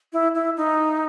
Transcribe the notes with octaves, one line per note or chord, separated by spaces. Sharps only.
E4
E4
D#4